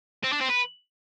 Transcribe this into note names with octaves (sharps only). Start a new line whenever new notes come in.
C4
D4
C4
B4